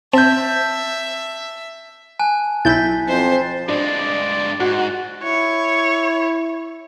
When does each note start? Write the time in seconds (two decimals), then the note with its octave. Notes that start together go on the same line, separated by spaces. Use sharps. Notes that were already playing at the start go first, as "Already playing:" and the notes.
0.13 C4 E5 A5 G6
2.19 G#5 A5 F#6
2.65 B1 E4 G6 A6 B6
3.08 F2 C5
3.69 G2 G#3 D4 D5
4.60 G#2 F#4
5.23 E4 C#5